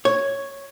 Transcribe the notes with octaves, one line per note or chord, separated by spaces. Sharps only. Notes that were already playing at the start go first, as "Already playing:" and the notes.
C#5